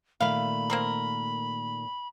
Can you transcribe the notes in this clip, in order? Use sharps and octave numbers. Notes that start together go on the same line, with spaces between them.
A#2 D#3 A3 E5 F5 B5
A#3 C4 A#4